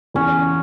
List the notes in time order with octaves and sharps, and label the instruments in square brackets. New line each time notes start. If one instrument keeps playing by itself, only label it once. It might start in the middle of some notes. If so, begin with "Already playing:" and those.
[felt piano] E2 [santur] C#4